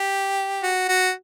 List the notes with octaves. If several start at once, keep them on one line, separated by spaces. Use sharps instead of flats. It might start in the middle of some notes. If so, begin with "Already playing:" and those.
Already playing: G4
F#4
F#4